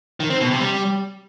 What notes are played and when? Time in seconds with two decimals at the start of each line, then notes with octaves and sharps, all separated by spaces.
0.20 D#3
0.30 C4
0.40 B2
0.51 C3
0.61 G3